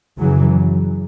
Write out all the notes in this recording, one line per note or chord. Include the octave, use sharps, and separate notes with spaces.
F#2 C#3 E3 F#3